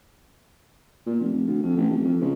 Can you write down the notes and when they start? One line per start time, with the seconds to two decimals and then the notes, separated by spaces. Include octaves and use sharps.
1.07 A#2
1.21 F1
1.33 F1
1.47 D2
1.62 F2
1.76 A1
1.90 F1
2.04 F2
2.21 C#2